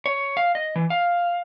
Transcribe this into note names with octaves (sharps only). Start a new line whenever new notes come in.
C#5
F5
D#5
E3
F5